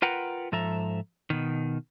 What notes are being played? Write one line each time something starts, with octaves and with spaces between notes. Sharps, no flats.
F4 A#4 B4 F#5 G5 A#5
G#2 F3 A4 E5 A#5
B2 D#3